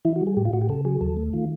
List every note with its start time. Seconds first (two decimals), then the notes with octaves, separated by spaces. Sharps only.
0.05 E3 E4
0.16 F#4
0.21 G3
0.27 G#4
0.37 A2 G4
0.45 F4
0.53 A2 F#4
0.61 G4
0.69 C#3 A4
0.85 F#3 G#4
1.01 D#2 A4
1.17 A3
1.33 D#3 F4